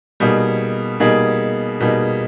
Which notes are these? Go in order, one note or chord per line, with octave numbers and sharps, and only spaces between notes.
B2 G3 A#3 D#4 G#4
B2 G3 A#3 D#4 G#4
B2 G3 A#3 D#4 G#4